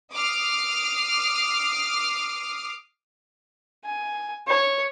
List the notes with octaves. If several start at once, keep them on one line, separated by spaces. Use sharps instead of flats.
D6 D#6 F6 C7
G#5
C#5